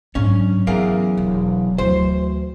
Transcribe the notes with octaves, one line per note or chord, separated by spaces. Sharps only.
G#2 F#3 C#4 D4
E2 C#4 A#4 F5
E1
D2 E3 F#3 C5